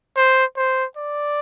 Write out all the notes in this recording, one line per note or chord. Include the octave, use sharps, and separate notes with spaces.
C5
C5
D5